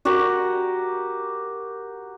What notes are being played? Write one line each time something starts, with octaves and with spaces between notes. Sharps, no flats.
F#4 G4 A#4 F#5